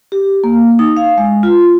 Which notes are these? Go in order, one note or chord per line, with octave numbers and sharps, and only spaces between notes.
G4
A#3
D#4
F5
G#3
F4